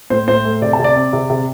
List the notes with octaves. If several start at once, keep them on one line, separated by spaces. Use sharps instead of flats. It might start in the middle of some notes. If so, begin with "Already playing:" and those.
A2 C5
A2 C5
A3
C3 D5
A5
C3
D5
C4
C3
C3